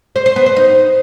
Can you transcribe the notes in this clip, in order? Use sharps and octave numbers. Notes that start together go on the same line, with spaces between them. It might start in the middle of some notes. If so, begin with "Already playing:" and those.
C5
C5
B3
C5
D#4